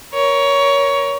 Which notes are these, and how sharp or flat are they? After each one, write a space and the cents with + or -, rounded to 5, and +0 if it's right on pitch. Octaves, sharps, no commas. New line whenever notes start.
A#4 +25 C#5 +15